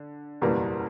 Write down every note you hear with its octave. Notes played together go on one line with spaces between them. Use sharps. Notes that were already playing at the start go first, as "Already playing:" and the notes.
Already playing: D3
F#1 E2 B2 G3 A#3